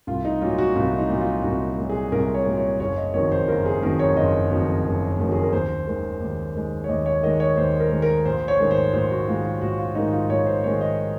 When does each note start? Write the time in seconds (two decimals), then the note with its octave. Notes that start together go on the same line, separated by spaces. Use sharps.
0.07 C2 F4
0.25 D#4
0.42 A#2 F#3 F4
0.58 F#4
0.75 C2 F4
0.98 D#4
1.10 A#2 F#3
1.21 F4
1.44 C2 F#4
1.78 A#2 F#3
1.90 G#4
2.12 C2 A#4
2.35 C#5
2.46 A#2 F#3
2.58 C#5
2.80 F#1 C#5
2.97 D#5
3.14 F2 D#3 F#3 C#5
3.32 C5
3.48 F#1 A#4
3.66 G#4
3.82 F2 D#3 F#3 A#4
3.99 C#5
4.16 F#1 D#5
4.50 F2 D#3 F#3
4.85 F#1
5.19 F2 D#3 F#3
5.32 G#4
5.42 A#4
5.53 D#2 C5
5.87 D#3 G#3
6.21 D#2
6.55 D#3 G#3
6.84 C#5
6.89 D#2 D#5
7.06 C#5
7.23 D#3 G#3 D#5
7.40 C#5
7.57 D#2 C5
7.80 A#4
7.91 D#3 G#3
8.02 A#4
8.25 A#1 C5
8.48 C#5
8.59 G#2 D#3 G#3
8.71 C5
8.93 A#1 C5
9.10 F#4
9.27 G#2 D#3 G#3 F4
9.45 F4
9.61 A#1 F#4
9.79 F4
9.95 G#2 D#3 G#3 D#4
10.13 F4
10.29 A#1 C#5
10.47 C5
10.64 G#2 D#3 G#3 C#5
10.81 D#5